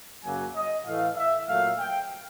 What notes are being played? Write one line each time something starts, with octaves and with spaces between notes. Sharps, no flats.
F#2 C#3 F#3 A#3 G#5
D#5
A2 E3 A3 F5
E5
A#2 F#3 A3 F5
G5